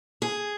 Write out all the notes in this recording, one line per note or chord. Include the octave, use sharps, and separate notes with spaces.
G#4